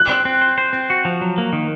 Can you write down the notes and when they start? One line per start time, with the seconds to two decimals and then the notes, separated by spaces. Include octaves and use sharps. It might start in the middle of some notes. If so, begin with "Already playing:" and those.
Already playing: F#6
0.09 C4
0.25 C4
0.41 C5
0.58 C5
0.73 C4
0.90 F#4
1.05 F3
1.21 F#3
1.38 A#3
1.53 D#3